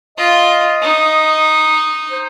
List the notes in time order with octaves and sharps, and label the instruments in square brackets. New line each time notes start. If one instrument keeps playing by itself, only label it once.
[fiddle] F4 [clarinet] D#5
[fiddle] D#4
[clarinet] C5